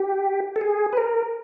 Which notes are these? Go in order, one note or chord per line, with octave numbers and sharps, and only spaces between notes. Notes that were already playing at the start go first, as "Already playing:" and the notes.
Already playing: G4
A4
G#4
B4
A#4